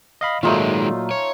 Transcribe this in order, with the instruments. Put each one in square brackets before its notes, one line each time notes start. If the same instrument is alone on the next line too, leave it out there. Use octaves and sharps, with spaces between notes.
[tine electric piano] D#5 F5 B5
[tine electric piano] A#2 F#3 [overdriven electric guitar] D#3 G#3 [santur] A3 D#4 F4
[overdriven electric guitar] C#5